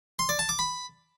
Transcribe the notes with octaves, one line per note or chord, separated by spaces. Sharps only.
C6
D5
A5
D6
B5